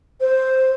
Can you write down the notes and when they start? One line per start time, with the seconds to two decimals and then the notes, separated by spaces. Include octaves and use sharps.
0.20 C5